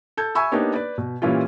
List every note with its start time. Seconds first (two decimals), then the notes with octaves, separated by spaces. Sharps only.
0.17 A4 G6 G#6
0.35 E5 G#5 B5 C#6 E6
0.52 A#3 B3 D4 D#4 G4 C#5
0.73 B4 D5
0.98 B2
1.22 A#2 E3 G3 C#4 E4 F4